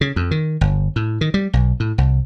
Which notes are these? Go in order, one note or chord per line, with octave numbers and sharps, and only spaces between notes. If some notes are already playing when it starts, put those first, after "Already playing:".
C#3
F2
D#3
G1
A2
D#3
G3
B1
A2
C2